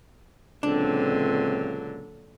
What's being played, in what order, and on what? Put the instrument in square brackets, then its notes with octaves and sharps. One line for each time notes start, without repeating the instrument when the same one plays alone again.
[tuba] C#2 [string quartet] A#2 D3 F#3 [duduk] C4 [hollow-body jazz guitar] D4